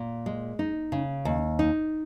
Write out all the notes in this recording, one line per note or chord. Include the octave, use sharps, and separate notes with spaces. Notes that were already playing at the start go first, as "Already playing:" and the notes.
Already playing: A#2
G#3
D#4
C#3
D#2
D#4